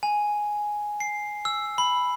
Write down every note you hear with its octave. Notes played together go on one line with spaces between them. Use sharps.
G#5
C7
E6
B5